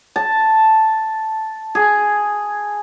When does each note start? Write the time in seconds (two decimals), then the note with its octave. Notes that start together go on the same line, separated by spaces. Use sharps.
0.16 A5
1.75 G#4